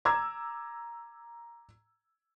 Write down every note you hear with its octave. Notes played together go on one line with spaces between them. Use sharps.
A#5 D6 E6 G#6